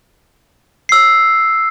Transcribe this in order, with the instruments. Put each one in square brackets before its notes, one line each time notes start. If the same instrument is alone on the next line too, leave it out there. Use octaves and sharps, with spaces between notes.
[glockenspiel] E6 C7